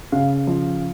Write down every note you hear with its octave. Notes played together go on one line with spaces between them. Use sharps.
C#3 F5
F3